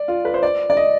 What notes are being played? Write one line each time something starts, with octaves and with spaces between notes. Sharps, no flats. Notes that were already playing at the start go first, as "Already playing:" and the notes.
Already playing: D5
F4
B4
C5
D5
D5
D#5